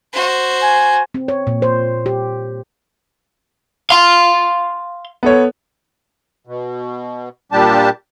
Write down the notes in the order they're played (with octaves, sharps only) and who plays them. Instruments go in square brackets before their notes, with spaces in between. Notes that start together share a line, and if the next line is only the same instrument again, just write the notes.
[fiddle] F#4 C5
[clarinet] G#5
[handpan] C4
C#5
A#2
C5
G4
[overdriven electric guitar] F5 C6
[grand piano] B3 A4 C#5
[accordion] B2
A#2 G3 D4 G4 A5